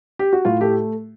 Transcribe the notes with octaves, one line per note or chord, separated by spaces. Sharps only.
G4
F#4
A2 F4
A3 G4